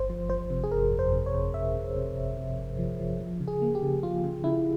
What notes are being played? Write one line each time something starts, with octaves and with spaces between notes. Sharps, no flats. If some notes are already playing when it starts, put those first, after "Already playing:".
Already playing: G1 C5
F3
F3 C5
C3
G#4
G1 A#4
F2
C5
C3
C#5
C3
C3 E5
C3
C3
G1
C3
G1
F3
F3
F3
C#3
G#4
A#3
G4
C#3
F3 F4
C#3
C#3 E4